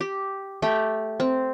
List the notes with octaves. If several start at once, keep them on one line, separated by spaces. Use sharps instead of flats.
G4
A3 G4 G5
C4